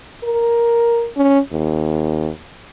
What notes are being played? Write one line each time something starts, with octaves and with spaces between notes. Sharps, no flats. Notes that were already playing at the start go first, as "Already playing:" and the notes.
A#4
C#4
D#2